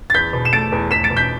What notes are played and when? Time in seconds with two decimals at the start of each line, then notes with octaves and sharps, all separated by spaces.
0.10 A6
0.14 E2 G6 B6
0.33 B2
0.45 E7
0.53 A3 A6 D7
0.72 E2
0.91 E2 B6 E7
1.04 A6 D7
1.10 B2
1.16 G6 B6